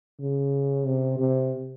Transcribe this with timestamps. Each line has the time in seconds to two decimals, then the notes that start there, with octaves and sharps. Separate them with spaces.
0.20 C#3
0.86 C3
1.19 C3